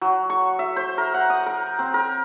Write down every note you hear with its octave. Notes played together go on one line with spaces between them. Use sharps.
F#3
C#6
E5
C5
A#4
F#5
D#6
A#4
C4
A#4